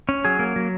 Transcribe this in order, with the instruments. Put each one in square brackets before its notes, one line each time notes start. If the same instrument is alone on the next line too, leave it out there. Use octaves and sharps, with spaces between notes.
[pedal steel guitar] C#4
F#3 G#4
A#3
F#3